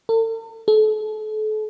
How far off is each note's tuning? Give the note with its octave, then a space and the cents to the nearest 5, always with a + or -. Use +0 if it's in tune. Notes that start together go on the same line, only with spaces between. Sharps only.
A4 +45
A4 -35